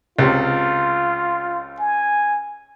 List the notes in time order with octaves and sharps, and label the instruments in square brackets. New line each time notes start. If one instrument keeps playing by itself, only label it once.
[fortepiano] C#2 C3 [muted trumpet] F4
[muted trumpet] G#5